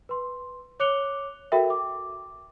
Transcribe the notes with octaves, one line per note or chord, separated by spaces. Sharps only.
B4 C6
C#5 D6 F#6 C#7 F7 G7
F#4 A4 A#4 E5 G5
D6